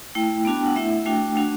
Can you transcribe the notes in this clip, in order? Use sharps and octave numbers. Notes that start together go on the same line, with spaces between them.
A3 E4 G5
B3 D4 F#4 A5
G5
F#5
A3 E4 E5
A3 D4 F#4 G5
A3 D4 F#4 F#5